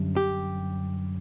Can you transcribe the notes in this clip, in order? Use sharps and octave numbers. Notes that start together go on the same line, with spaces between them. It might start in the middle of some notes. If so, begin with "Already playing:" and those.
Already playing: F#2 D3 G3
G4